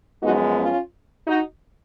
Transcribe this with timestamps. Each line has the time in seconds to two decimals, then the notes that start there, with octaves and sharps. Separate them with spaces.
0.23 F#2 F3 G#3 B3 D#4 F#4
0.57 C#4 F4
1.26 D#4 F#4